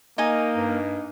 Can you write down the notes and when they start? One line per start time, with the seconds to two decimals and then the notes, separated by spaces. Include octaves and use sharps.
0.18 A#3 D#4 D#5 G#5
0.55 G2